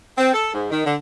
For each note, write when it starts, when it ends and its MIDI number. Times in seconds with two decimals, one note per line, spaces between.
0.18 0.32 60
0.33 0.52 69
0.54 0.71 44
0.71 0.84 51
0.86 0.96 50